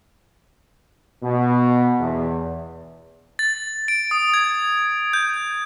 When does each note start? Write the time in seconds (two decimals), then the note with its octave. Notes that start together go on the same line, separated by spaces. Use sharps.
1.23 B2
2.00 E2
3.39 A6
3.88 D7
4.11 D#6
4.34 G#6
5.13 G6